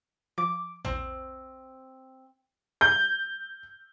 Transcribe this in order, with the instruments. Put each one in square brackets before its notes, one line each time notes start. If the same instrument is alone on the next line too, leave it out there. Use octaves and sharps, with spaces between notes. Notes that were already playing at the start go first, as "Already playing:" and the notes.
[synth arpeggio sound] F3 [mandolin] D6
[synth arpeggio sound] A#1 E2 [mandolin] C4
[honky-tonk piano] G6